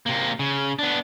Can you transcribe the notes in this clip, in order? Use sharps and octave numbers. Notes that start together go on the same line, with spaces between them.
C3 A#3
C#3
B3 D4